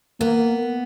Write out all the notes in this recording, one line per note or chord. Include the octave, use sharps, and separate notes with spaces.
A#3 B3